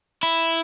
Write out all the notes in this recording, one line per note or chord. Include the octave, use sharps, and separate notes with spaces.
E4